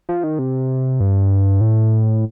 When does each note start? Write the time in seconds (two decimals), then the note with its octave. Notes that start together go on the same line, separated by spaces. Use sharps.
0.09 F3
0.24 D#3
0.39 C3
1.00 G2
1.61 A2